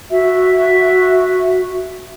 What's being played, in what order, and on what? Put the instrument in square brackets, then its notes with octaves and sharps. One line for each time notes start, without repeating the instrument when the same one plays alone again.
[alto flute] F#4 [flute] E5